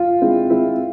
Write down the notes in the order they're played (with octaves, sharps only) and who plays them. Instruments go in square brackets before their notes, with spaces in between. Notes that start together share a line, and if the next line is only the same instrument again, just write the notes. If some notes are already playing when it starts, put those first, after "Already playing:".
Already playing: [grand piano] F4
[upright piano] G#3 C4 E4
G#3 C4 E4